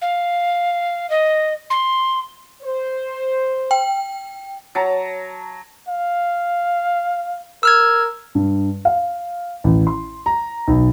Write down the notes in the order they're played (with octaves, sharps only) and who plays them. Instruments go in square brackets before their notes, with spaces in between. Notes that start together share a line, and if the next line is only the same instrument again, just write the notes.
[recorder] F5
D#5
C6
[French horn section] C5
[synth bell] G5
[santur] F#3 A5 A#5
[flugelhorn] F5
[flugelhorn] A#4 [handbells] E6 F6 G#6
[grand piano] G2
F5
A1
C6
A#5
B1